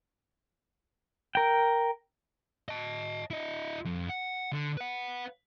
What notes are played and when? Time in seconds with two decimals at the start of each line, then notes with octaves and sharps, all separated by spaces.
1.35 A#4 G5
2.69 D#5 A5
3.31 E4 D#5
3.85 F2
4.09 F#5
4.52 D3
4.77 B4 F#5